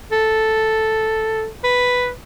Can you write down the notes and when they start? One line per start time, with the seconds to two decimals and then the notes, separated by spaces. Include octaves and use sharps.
0.12 A4
1.64 B4